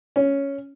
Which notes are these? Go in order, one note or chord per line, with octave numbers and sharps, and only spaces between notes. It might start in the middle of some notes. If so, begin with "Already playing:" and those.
C#4